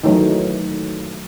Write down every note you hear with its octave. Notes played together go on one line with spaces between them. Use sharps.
D#3 E3 F#3 A3 D#4